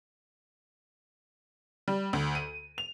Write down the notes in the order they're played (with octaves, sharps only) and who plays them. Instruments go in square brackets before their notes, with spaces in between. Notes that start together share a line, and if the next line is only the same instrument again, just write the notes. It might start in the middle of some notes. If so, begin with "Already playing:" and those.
[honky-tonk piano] G3
D2
D#7
F7